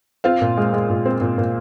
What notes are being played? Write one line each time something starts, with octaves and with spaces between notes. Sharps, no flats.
C4 F4 F5
A#2
G#3
G#3
A#2
C4
A#2
A#2